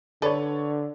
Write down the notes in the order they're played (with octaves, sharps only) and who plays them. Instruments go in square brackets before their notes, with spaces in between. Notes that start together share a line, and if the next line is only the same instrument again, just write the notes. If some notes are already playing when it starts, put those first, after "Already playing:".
[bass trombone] D3 [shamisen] A4 B4 [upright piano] C#5 D5